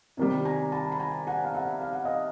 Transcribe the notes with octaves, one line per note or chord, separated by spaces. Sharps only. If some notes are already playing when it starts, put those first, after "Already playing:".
C3 D#3 G3
G#5 A#5
A5 B5
B5
G#5 A#5
F#5 G#5
F5
E5 F#5
F5
F#5
D#5 F5